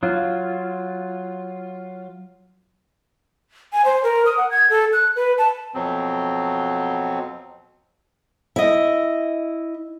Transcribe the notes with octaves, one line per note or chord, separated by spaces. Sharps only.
F#3 F4
G#5
C5
A#4
D#6
F#5
G#6
A4
F#6
B4
A5
F2 B2 F#3 C4
E4 D#5